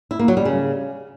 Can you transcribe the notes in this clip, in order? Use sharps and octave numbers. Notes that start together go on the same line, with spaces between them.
E4
A#3
F#3
G3
C#3